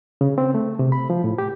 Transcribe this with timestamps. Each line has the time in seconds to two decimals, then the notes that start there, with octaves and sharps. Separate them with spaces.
0.21 C#3
0.38 C4
0.54 A3
0.79 C3
0.92 B5
1.10 F3
1.24 A2
1.38 G4